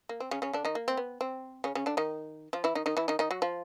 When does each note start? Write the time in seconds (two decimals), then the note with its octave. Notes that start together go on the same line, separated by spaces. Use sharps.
0.09 A#3
0.20 C4
0.31 C#3 C#4
0.42 C#3 C#4
0.53 D3 D4
0.65 D#3 D#4
0.75 A#3
0.88 C4
0.97 B3
1.21 C4
1.64 C#3 C#4
1.75 C#3 C#4
1.86 D3 D4
1.97 D#3 D#4
2.53 F3 F4
2.64 E3 E4
2.75 D#3 D#4
2.86 D#3 D#4
2.97 E3 E4
3.08 D#3 D#4
3.19 D#3 D#4
3.31 F#3 F#4
3.42 F3 F4